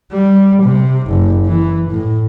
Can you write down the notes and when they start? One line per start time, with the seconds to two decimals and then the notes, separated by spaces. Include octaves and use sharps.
0.12 G3
0.63 C3
1.07 F#1
1.46 E3
1.90 A2